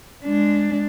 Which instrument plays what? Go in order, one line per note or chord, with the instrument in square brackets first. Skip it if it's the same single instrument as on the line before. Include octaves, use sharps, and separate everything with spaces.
[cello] G#3 D4